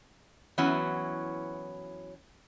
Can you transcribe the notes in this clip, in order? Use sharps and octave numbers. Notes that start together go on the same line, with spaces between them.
E3 F#3 B3 C#4 E4 F#4